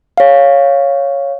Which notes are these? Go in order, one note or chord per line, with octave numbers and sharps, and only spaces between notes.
C#5 F5